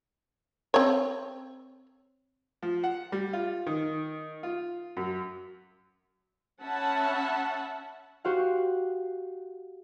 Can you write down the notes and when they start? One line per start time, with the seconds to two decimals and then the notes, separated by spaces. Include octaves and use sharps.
0.74 C4 C#5
2.63 F3
2.84 F#5
3.12 G3
3.33 F4
3.67 D#3
4.43 F4
4.97 F#2
6.62 C#4 E5 F#5 A5 B5
8.24 F#4 G4 C5 F5 F#5